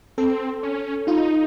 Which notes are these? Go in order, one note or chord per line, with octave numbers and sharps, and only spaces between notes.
C4 A4
C#4
D#4 F4